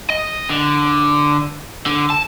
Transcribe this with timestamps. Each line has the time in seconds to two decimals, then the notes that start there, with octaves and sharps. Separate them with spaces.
0.10 D#5
0.49 D3
1.86 D3
2.10 A5